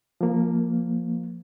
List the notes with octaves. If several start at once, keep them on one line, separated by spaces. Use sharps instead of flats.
F3 A#3